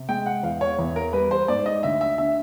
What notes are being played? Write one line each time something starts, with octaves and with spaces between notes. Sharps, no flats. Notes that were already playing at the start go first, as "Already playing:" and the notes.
Already playing: C3
G#3 G5
F#5
E2 F5
C#5
E2
A#4
G3 B4
C5
G#2 D5
D#5
D2 E5
E5
D3 E5